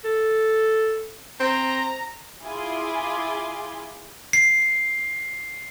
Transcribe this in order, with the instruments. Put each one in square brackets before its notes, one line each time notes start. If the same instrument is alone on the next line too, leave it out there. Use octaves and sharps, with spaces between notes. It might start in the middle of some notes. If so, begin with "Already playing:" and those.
[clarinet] A4
[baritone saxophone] C4 [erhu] A#5
[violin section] E4 F4 G#4 G#5 C6 D6
[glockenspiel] C7